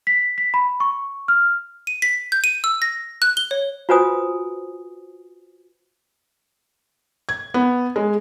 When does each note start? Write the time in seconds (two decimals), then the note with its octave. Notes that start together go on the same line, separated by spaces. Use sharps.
0.07 B6
0.38 B6
0.54 B5
0.80 C#6
1.28 F6
1.87 D#7
2.02 B6
2.32 G6
2.44 D#7
2.64 E6
2.82 A#6
3.22 F#6
3.37 G7
3.51 C#5
3.89 F4 F#4 B4 C5 G#5 D#6
7.29 G#6
7.54 B3
7.96 G#3